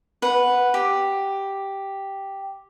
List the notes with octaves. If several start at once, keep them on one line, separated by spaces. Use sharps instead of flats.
B4 F#5
G4